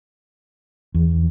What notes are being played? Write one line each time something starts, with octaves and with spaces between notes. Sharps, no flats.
E2